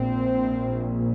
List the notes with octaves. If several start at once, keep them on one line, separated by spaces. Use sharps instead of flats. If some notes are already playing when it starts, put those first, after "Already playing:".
Already playing: A#1 A#2 C4